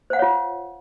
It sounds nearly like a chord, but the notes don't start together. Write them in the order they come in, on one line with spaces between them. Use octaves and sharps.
C5 F#5 F5 C#5 F4